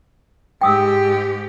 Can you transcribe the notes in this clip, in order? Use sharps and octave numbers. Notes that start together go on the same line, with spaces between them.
G#2 G4 G5 D#6 E6